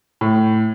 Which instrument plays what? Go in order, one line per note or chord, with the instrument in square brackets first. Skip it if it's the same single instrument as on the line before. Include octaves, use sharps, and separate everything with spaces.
[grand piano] A2